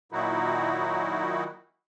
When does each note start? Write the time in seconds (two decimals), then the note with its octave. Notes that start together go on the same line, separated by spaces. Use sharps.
0.12 A#2 D#3 F#3 D#4 E4 F#4